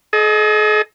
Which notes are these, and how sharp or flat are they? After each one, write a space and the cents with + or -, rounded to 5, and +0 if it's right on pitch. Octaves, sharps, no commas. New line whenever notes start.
G#4 +45 D#5 +0